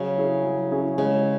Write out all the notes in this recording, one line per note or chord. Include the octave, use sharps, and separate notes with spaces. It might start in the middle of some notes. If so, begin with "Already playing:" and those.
Already playing: C#3 F#3
C#4 E4 G#4
F#3
C#4 E4 G#4
C#3 G#3